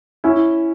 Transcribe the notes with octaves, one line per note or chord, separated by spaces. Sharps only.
C#4 E4